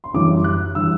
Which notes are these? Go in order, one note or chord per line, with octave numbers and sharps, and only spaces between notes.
C6
F#2 E3 G3 D6
F#6
E3 G3 E6